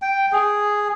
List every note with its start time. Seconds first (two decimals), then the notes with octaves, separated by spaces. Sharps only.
0.02 G5
0.32 G#4